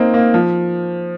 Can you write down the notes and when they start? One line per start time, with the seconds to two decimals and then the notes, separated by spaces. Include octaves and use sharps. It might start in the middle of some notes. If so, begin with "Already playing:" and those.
Already playing: A#3 C4 D#4
0.14 A#3
0.34 F3